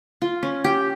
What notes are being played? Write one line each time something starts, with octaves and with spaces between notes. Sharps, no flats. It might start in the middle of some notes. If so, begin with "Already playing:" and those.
F4
C#4
G4